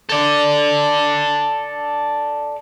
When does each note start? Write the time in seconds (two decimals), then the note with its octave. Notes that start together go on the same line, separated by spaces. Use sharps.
0.09 A4 D5